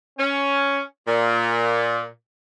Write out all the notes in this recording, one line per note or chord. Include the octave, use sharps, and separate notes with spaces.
C#4
A#2